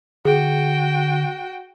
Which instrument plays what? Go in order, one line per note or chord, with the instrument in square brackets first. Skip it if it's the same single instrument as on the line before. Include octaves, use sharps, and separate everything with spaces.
[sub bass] D3 [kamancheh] F#4 G5 [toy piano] G#4